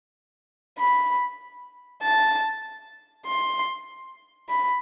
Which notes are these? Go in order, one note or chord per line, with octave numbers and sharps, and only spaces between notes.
B5
A5
C6
B5